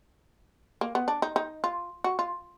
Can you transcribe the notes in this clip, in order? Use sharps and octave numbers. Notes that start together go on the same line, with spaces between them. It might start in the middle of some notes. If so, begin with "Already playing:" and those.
A#3
B3
D4
D#4
D#4
F4
F#4
F4